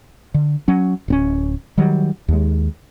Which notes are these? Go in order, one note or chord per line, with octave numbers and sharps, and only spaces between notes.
D3
F#3 C#4
D1 C4 C#4
D#3 F#3 G3
D#2 G#3